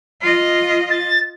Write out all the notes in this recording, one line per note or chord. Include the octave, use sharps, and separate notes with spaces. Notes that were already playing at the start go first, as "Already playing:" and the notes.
F4 D#5
A6